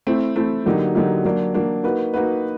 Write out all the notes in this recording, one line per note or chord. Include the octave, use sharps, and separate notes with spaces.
A3 C4 E4
A3 C4 E4
D3 F#3 A#3 D#4 G4
D3 F#3 A#3 D#4 G4
F#3 A#3 D4
F#3 A#3 D4
A#3 D#4 F#4 B4
A#3 D#4 F#4 B4